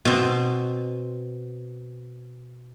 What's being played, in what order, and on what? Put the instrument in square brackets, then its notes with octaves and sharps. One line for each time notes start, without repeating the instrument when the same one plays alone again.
[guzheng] B2 C4